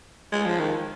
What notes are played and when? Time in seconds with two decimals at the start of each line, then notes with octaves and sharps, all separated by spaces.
0.32 G#3
0.46 F3
0.60 D#3